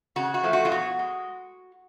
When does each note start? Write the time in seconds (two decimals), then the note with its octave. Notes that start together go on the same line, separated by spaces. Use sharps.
0.16 C#3 F#4
0.34 F#4
0.43 F3 A3
0.53 F#4
0.65 F4
0.72 B2 F#4
0.99 G#3